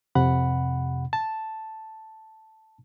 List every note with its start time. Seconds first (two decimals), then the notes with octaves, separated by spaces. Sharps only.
0.15 F2 C3 F#5 B5
1.13 A5